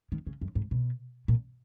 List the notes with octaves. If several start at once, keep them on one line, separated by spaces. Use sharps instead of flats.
D#3
C#3
F#2
G#2
B2
A#2